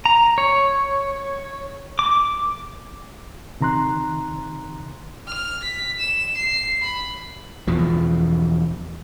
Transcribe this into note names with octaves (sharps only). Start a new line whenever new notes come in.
A#5
C#5
D6
C3 D#3 A#5 C6 F#6
F6
B6
E7
C7
B5
E2 B2 F3